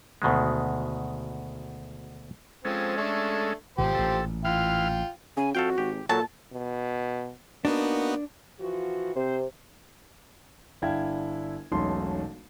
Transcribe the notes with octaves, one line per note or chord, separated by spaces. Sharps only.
D2 B2 D#3 G#3
F3 G#3 C4 C#4 A4
A3 D4
G#1 B2 F3 G4 C5
A1 A#2 A4
E3 F4 F5 G5 F6
C#3 G#5
F2 F#4 A4 F5 G5
G#1 G4
A#2 F#3 A4 A5
B2
A#3 B3 D4 D#4 F#4
E3 F3 F#4
C3 C4 C5
G1 D4 E4 F5 G5 G#6
E1 B1 A3 C#4 D#4 C6